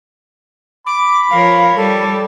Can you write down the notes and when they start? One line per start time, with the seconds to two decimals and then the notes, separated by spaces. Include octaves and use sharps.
0.86 B5 D6
1.31 F3 A#4 C#5 F5
1.76 G3 A4